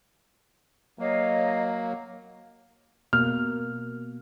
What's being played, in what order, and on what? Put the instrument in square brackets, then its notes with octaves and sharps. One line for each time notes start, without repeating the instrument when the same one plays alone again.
[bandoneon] F#3 A#3 [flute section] C#5 D#5 F5
[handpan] B2 A#3 [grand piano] F6